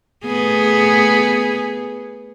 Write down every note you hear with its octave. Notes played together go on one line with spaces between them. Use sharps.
A3 B3 G#4